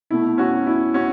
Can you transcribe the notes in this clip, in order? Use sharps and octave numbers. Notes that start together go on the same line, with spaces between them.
B2 A3 E4
C#4 F#4
E4
C#4 F#4